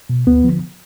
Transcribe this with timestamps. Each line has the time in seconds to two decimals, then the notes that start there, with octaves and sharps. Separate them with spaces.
0.10 B2
0.27 D2 B3
0.44 D3 F3